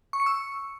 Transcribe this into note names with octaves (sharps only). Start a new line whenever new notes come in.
C#6
C#7
E6